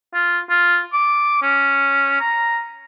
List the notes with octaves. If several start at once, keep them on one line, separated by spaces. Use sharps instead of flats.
F4
F4
D6
C#4
A#5